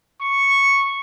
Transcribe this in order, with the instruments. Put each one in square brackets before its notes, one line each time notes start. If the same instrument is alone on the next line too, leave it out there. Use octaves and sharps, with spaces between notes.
[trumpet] C#6